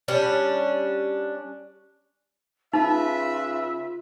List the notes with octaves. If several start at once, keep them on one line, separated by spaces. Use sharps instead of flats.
G3 C#4 D4
C#3 D#4 F4 B4 E5